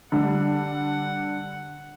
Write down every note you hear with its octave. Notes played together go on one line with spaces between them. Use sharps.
D3 G3 F#5